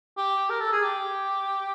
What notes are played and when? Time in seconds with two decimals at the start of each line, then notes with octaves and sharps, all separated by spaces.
0.17 G4
0.50 A#4
0.60 A4
0.72 G#4
0.84 G4